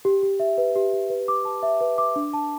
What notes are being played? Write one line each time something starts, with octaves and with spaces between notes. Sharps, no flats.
G4
G4
E5
B4
G4
G4
B4
D6
A5
E5
B4
D6
D4
A5